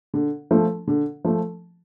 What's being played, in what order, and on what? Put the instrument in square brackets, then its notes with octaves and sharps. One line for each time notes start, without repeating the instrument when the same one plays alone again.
[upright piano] D3
F3 A3
D3
F3 A3